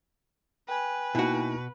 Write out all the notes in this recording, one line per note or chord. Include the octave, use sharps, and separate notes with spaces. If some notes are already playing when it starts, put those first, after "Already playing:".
B4 G5 G#5
B2 A#3 D#4 E4 F#4